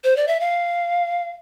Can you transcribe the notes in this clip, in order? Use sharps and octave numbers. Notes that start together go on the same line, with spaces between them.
C5
D5
E5
F5